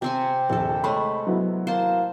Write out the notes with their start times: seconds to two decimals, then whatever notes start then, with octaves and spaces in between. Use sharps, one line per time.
0.02 C3 C4 G4 G#5
0.49 A#1 D#2 C4 A4
0.84 G#3 A3 C5 C#5 B5
1.27 F#3 B3 E4
1.67 A#3 C5 A5